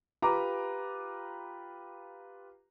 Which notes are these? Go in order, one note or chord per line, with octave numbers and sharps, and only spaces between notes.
F4 G4 B4 A#5 D6